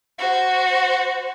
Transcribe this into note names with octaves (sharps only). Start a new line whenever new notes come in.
F#4 C5